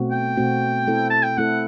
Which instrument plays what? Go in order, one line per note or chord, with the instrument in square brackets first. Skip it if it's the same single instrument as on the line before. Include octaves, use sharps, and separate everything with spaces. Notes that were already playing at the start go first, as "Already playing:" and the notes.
Already playing: [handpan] B2 A3 C4 F#4
[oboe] G5
[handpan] B2 A3 C4 F#4
A3 C4 E4 A4
[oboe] A5
G5
[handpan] A3 C4 E4 A4 [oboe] F#5